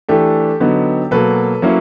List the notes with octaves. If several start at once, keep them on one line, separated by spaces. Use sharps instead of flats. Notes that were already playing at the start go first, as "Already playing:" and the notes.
E3 A3 D4 G4 A4
D3 F#3 B3 D#4
B2 F#3 A#3 A4 B4
F#3 A#3 C#4 E4